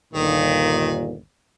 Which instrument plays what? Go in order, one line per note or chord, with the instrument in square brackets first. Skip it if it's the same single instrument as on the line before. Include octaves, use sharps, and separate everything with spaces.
[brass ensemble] G1 D#2 A#2 [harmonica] D#3